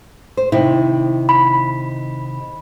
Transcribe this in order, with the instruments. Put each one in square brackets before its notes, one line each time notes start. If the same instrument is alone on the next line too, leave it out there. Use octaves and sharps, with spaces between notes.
[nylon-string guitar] C5
C3 D#3 E4
[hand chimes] B5